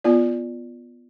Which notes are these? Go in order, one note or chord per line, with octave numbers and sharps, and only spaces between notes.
B3 F4 D5